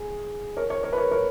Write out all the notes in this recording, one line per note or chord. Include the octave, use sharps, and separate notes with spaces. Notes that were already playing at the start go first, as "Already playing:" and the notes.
Already playing: G#4
A#4 C#5
A#4 C#5
A#4 C#5
B4
A#4 C#5
A#4 C#5